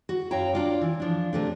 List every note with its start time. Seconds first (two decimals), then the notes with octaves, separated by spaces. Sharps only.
0.09 F#4
0.31 F#2 F#4 C#5 F5 G5 A#5
0.53 D4 F4 D5
0.81 E3
1.00 F3 D4
1.33 C3 A3 D4